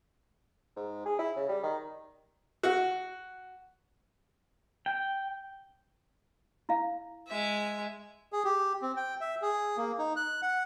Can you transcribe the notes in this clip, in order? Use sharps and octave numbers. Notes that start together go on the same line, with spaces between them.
G#2
G#4
E4
C#3
G3
D#3
F#4
G5
E4 F5
G#3 E5
G#4
G4
C4
G5
E5
G#4
A#3
D#4
F#6
F#5